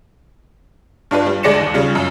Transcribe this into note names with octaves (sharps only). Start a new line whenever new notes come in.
G2 D4 F4 B4
G3
D2 G#3 D5 A#6 C#7 E7
D#2
C#3 G3 F4
F#2